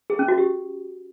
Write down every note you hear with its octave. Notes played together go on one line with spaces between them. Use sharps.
G#4
C#4
F#4
G4